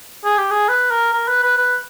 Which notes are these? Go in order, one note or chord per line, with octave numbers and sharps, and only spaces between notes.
G#4
G4
G#4
B4
A#4
A#4
B4
B4
B4